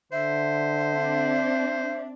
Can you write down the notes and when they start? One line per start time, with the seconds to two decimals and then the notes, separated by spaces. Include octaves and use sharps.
0.12 D3 C5 E5
0.92 C4 D4